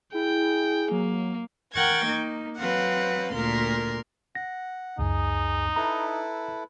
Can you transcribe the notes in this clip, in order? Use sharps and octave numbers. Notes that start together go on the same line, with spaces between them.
E4 G#4 G5
F#3 A#3
A#4 F#5 G5 C#6 G#6 A6
A#3 D#4
F#3 C4 B4 F5 F#5
D2 A#2 A#4 C6
F#5 A#6
C#2 F#2 D#4 G#4
E4 A4 B4 A#5